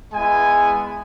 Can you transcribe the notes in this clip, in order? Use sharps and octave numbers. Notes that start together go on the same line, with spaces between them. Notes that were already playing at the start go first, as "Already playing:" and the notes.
G#3 B3 E4 G#5